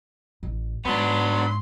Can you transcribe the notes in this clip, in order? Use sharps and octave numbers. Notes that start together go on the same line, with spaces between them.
A1
G#2 F#3 B3 D4 B5 C6